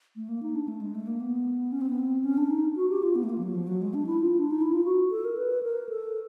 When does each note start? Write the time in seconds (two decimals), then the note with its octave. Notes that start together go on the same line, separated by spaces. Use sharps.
0.16 A3
0.29 A#3
0.43 D#4
0.55 D4
0.68 A3
0.81 G#3
0.95 A3
1.07 A#3
1.20 B3
1.72 C#4
1.81 C4
1.89 B3
1.99 C4
2.24 C#4
2.37 D4
2.50 D#4
2.76 F#4
2.89 G4
3.03 F4
3.16 B3
3.23 A3
3.29 A#3
3.38 F3
3.42 F#3
3.55 F3
3.67 F#3
3.81 G#3
3.94 D4
4.06 E4
4.20 F4
4.38 D4
4.51 D#4
4.62 E4
4.73 F4
4.84 F#4
5.11 A4
5.25 A#4
5.37 B4
5.63 A#4
5.89 A4